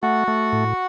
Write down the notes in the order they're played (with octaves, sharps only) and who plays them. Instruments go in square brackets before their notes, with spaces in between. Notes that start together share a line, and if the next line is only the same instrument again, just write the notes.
[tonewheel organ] A3 [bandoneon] F#4 F#5
[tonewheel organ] A3
A2